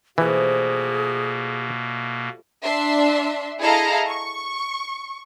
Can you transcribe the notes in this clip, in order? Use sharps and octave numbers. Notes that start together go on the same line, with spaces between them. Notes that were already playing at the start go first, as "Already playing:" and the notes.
B2 E3 F3 G3 A3 A#3 G#4
D4 E5 C6
E4 G#4 A4 D#5 F5 A#5
C#6